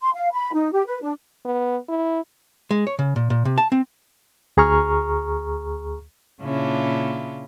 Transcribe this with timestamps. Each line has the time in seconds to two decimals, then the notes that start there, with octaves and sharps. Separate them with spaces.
0.01 C6
0.15 F5
0.32 B5
0.54 D#4
0.73 G4
0.87 B4
1.01 D4
1.45 B3
1.89 E4
2.71 G#3
2.87 C#5
2.99 C#3
3.16 A#2
3.30 A#2
3.45 C3
3.58 A5
3.72 C4
4.57 D2 G#4 A#5 C#6 F6
6.42 A#2 C#3 C#4 D4 E4 F4